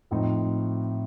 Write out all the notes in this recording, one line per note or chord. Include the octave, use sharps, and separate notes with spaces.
A2 F3 C4 D#4